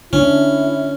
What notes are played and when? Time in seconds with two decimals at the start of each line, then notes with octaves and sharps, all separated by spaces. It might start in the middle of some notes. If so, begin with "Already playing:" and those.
0.13 D3 C#4 D4 E4